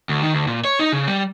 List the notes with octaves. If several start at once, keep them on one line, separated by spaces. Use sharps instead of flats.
D2
D#3
D2
A#2
C#5
D#4
C#3
G3